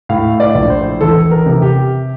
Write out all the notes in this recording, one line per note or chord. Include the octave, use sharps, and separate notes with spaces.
A2 F5
D5
A#1
C5
E2 A4
A#4
C3
G4